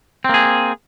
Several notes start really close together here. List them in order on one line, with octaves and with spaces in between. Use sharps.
C4 A#3 G#4